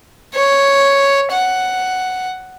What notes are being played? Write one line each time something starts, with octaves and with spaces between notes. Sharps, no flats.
C#5
F#5